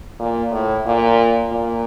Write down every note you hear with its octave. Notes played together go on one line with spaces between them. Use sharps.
A#2
A2
A#2
A#2